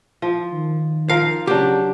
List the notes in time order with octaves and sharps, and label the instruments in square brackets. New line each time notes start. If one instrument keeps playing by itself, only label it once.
[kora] F3
[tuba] D#3
[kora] F3 A#4 [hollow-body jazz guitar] F5
[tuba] C#3 [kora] F#3 D4 [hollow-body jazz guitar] G4